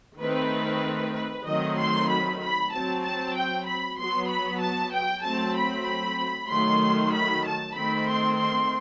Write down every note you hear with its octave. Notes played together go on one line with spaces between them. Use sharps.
D#3 A3 C4 B4
B4
D#3 F#3 A3 C4 D#5
C6
B5
B5
F#3 C4 A5
A5
G5
B5
F#3 B3 C6
B5
A5
G5
F#3 A3 C4 A5
B5
D#3 F#3 A3 C6
B5
A5
D#3 A3 C4 B5
C6
C6